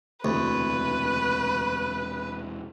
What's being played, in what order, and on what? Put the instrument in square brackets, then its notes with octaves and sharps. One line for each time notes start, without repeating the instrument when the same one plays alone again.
[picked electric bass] E1 C3 E3 [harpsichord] D2 [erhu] B4